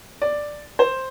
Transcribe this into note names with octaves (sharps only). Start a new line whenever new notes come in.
D5
C5